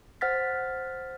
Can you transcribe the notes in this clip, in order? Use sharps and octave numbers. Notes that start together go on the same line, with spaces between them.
C5 F#5 F6 A6 B6